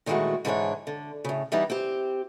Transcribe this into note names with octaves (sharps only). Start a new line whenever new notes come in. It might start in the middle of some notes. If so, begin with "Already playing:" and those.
A#2 D#3 E3 G#3 A3 F#4
G#2 D3 E3 F4 G#4 C#5
D3
A2 C#3
E3 G3 B3 D#4
C4 G4